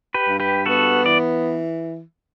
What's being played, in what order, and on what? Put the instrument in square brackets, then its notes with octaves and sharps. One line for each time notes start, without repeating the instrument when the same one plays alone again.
[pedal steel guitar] G4 B4
[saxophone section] G2
[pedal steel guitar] G4 B4
[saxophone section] B3 [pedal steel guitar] F#4 A4
[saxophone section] E3 [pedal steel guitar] D5